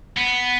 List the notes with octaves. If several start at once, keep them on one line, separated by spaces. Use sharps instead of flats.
B3